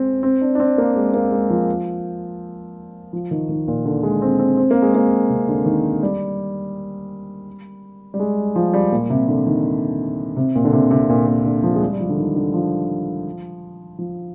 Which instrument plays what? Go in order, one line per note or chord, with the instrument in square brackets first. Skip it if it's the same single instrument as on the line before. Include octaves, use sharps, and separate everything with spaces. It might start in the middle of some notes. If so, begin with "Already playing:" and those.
Already playing: [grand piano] G#3 C4
C4
D4
D4
C4
A#3
G#3
A#3
G#3
F3
F3
D#3
D#3
A#2
D3
G#3
C4
C4
C4
A#3
G#3
A#3
C3
D3
D#3
G3
G3
G#3
F3
G3
A#2
C3
D3
D#3
C3
A#2
D3
C3
C3
A#2
A#2
D3
F3
G#3
G3
G3
F3
D3
D#3
D3
F3
F3